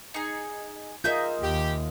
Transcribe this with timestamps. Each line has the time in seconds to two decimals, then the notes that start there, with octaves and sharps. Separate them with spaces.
0.14 D#4 G#4
1.04 F4 G#4 A#4 D#5 E5 G6
1.41 D#2 G4